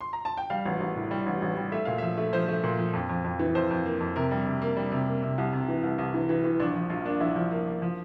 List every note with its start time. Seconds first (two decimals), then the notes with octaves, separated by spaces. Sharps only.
0.01 C6
0.13 A#5
0.25 A5
0.37 G5
0.50 G3 F5
0.65 A1
0.80 A1
0.96 A2
1.11 G3
1.26 A1
1.42 A1
1.57 G3
1.72 A3 E5
1.85 A#2 F5
1.98 F3 E5
2.17 A3
2.33 F3 C5
2.48 A3
2.64 A#2
2.79 F3
2.93 F2
3.09 F2
3.24 F2
3.40 E3
3.55 F2 C5
3.71 F2
3.86 A#3
4.00 F2
4.16 C3 A#4
4.31 G3
4.46 C3
4.62 A#3
4.77 G3
4.92 C3
5.07 A#3
5.23 C3
5.38 C2
5.53 C3
5.68 E3
5.83 C2
5.98 C2
6.14 E3
6.29 E3
6.44 E3
6.60 A#1 D4
6.75 F3
6.90 A#1 F4
7.05 A#3 D4
7.21 A#1 E4
7.36 F3
7.51 A#3
7.66 A#3
7.82 F3